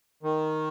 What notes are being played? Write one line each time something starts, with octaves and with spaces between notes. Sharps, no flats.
D#3